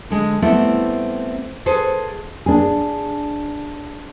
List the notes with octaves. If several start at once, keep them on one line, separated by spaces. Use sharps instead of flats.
D3 G#3
G3 A3 B3 C4 E4
G#4 A4 B4 C5
D4 G#4